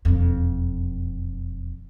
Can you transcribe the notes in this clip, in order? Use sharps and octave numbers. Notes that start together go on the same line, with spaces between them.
E1 F2